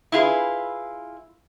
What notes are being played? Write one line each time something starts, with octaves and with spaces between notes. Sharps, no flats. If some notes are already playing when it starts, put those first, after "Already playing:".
E4 F4 G#4 B4